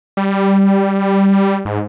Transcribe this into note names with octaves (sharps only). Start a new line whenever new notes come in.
G3
G#2